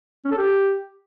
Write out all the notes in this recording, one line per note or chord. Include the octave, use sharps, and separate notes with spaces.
C#4
A4
G4